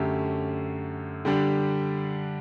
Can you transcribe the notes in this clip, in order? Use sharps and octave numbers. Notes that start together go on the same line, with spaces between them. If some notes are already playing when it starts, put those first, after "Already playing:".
Already playing: F#2 D3 A3 C#4 G4
D3 G3 D4 G4